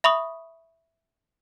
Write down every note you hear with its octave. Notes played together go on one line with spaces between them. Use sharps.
E5 B5 C#6 D#6